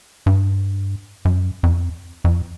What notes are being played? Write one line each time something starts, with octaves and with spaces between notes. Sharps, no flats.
G2
F#2
F2
F2